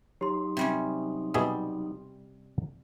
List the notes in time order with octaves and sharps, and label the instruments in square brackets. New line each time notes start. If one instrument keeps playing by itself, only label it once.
[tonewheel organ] F#3 D#4 [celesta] G4 C6
[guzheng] C3 G3 C#4
[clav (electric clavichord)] B2 G#4 E5 [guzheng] G3